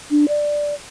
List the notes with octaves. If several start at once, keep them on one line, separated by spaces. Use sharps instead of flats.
D4
D5